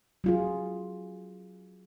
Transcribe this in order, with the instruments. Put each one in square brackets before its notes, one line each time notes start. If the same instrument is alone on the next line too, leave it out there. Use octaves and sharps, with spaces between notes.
[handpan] F#3 F4 G#4